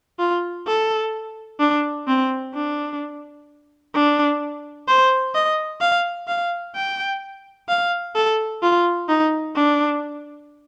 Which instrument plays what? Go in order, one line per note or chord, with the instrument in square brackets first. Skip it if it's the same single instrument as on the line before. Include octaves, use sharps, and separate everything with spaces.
[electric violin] F4
A4
D4
C4
D4
D4
C5
D#5
F5
F5
G5
F5
A4
F4
D#4
D4